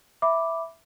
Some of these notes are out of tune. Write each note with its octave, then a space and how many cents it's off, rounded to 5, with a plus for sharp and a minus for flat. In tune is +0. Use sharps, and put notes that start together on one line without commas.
E5 +0 B5 +0 D6 +0